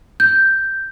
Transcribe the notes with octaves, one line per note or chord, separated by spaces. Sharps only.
G6